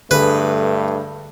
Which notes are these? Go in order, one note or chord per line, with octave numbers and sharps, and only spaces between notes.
G2 D3 A3 G#4 B4